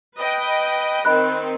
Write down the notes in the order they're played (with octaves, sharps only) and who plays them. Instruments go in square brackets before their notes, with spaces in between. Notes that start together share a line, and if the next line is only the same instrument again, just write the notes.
[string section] B4 D#5 G5
[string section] D#3 C4 [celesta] D#5 B5 F#6